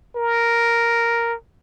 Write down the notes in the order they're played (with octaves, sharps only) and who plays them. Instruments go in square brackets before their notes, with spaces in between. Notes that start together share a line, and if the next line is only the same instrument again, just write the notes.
[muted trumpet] A#4